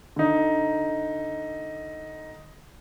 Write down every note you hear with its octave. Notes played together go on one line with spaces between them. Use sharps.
D3 D#4